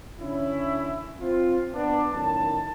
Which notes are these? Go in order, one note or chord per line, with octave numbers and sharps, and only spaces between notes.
D3 C#4 E4
C4 F4
B3 D4
F#2 A2 D#3 A5